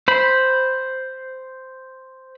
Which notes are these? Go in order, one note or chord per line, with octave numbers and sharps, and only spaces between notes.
C5 B5